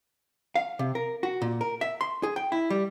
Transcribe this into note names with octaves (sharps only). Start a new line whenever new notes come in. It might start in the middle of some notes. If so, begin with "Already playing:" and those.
F5
C3
A#4
F#4
A#2
A#4
E5
C6
G#4
G5
E4
G3